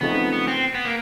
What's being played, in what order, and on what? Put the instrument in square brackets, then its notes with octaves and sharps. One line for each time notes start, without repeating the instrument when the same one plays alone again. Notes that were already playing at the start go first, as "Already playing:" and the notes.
[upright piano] C#3 F3 A3 C4 D#4 [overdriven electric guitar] B3
[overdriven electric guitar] B3
C4
B3
A#3